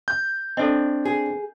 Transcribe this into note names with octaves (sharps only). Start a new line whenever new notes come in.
G6
C4 D4 A4 D#5
G#4